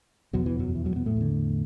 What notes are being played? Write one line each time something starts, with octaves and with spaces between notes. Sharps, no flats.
E2 B2 F#3
E3
F#2 F#3
E3
F#2 F#3
B2 B3
A2 A3
E2 D3